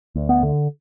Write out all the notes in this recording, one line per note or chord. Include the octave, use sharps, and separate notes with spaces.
D2
B3
D3